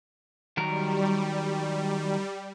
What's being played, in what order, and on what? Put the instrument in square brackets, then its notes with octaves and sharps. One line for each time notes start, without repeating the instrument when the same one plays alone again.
[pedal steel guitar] D#3 F#3 A#4 [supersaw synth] G3